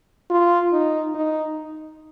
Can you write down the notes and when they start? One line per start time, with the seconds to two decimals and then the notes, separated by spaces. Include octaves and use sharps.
0.30 F4
0.73 D#4
1.15 D#4